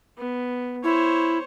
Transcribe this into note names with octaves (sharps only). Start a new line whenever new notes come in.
B3
E4 C5 C#5